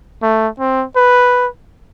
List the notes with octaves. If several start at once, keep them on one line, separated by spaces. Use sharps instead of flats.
A3
C4
B4